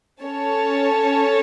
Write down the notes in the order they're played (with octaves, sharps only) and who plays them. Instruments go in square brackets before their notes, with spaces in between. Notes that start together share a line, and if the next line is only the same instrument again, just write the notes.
[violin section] C#4 A4 C#5 A5